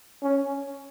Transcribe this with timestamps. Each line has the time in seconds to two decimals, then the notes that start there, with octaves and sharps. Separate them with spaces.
0.23 C#4